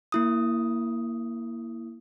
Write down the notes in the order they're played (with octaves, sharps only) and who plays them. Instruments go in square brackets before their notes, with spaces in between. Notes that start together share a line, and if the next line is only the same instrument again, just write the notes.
[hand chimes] A#3 E4 D#6